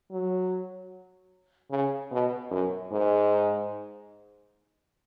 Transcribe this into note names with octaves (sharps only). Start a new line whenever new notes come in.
F#3
C#3
B2
F#2
G#2